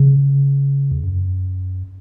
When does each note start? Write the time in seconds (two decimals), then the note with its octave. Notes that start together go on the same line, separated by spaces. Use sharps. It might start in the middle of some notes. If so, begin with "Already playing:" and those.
Already playing: C#3
0.92 E2
1.04 F#2